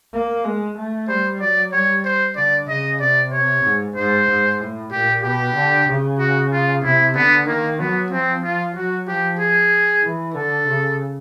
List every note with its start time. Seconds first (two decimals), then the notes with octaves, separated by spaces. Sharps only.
0.13 A#3
0.44 G#3
0.77 A3
1.08 G3 C5
1.40 F#3 D5
1.72 G3 C#5
2.04 C5
2.36 D3 D5
2.68 C#3 D#5
3.00 C3 D5
3.32 C#5
3.64 G#2
3.96 G#2 C5
4.28 G#2
4.60 A2
4.92 A#2 G4
5.23 B2 G4
5.55 D3
5.88 C#3
6.19 F#4
6.52 F4
6.83 C3 E4
7.15 D3 B3
7.47 D#3 A#3
7.79 F#3 B3
8.11 F3 C4
8.43 F4
8.75 F#3 F#4
9.07 F3 G4
9.39 G#4
10.03 E3
10.34 D3 A4
10.67 C#3